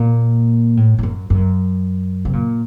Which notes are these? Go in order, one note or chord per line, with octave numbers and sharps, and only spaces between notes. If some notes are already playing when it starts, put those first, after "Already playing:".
Already playing: A#2
A2
A2
F#2
F#2
C3
A#2